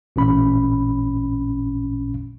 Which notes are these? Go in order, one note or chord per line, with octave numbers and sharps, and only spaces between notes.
A1 A#2 C#4 B5